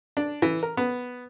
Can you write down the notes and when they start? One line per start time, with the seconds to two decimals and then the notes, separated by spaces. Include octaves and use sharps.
0.17 D4
0.42 E3
0.63 A#4
0.77 B3